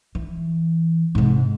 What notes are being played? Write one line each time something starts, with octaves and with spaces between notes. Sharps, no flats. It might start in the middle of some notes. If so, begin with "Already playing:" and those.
E3
G#2 C3